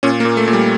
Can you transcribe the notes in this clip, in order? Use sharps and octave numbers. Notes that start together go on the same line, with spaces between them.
A#2 C#4
A#3
A#2
A3
A#2
G3